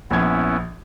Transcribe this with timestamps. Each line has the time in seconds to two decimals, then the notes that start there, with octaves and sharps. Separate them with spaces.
0.11 A#1 B3 C#4 E4 G#6